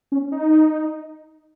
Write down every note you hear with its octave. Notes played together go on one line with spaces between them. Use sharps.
C#4
D#4